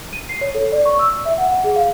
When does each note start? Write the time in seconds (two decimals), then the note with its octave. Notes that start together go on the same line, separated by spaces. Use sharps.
0.13 D#7
0.29 C7
0.41 C#5
0.55 A4
0.72 D5
0.86 C#6
0.99 E6
1.25 E5
1.38 F#5
1.49 F#5
1.64 G#4
1.76 F5